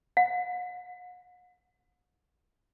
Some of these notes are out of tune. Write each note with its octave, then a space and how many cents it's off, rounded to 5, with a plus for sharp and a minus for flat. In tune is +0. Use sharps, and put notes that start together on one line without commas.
F#5 -40